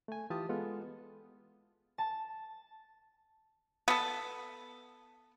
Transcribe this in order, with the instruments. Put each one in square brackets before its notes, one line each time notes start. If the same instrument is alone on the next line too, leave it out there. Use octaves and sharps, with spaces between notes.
[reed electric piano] A3 G#5
E3 F4 G4 A5 D#6
G#3 B3 F4 A4
[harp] A5
[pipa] B3 A4